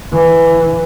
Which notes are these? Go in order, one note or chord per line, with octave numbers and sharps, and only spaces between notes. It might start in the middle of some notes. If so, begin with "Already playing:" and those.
E3